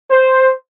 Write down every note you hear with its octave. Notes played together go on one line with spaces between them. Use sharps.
C5